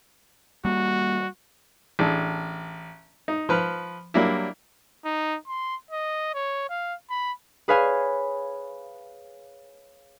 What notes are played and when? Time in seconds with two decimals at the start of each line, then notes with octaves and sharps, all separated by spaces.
0.65 G3 A#3 F#4
1.99 A1 D4 G#4 A4
3.28 D#4
3.49 F3 B4 F6
4.14 F#3 G3 A#3 D4 E4
5.05 D#4
5.48 C6
5.91 D#5
6.34 C#5
6.70 F5
7.10 B5
7.68 G#4 B4 C#5 F5 G#5